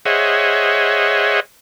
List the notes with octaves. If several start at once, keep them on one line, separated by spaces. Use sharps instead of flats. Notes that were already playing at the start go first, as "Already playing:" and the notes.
G#4 C5 C#5 D#5 E5 F#5